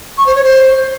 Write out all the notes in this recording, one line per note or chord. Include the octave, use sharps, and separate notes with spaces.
C#6
C5
C#5
C5